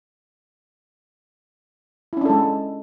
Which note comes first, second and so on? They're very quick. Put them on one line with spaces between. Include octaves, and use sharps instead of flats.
E4 C#4 D4 A4 G#3